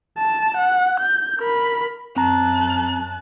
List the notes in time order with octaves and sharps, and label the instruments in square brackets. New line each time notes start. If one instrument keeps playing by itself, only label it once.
[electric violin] A5
F#5
G6
A#4 B5
[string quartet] F#2 A5 F#6 [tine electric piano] C4 A#5